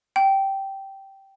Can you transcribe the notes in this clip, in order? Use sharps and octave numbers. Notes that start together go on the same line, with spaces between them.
G5